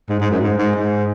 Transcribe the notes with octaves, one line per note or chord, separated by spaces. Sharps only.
G#2
G#2
F#2
G#2
G#2
G#2